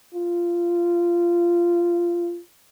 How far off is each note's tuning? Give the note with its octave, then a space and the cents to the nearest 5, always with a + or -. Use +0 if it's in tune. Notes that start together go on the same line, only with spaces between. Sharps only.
F4 -15